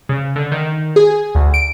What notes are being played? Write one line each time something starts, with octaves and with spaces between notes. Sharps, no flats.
C#3
D3
D#3
G#4
D2
D7